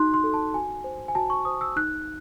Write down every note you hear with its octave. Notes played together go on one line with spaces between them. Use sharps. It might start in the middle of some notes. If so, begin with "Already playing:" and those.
Already playing: D#4 F#4 A4 C6 F#6
C6
F#4 A4
A5
F#4 G#5
C5
G#5
F#4 A5
C#6
C5 D#6
E6
D#4 F#6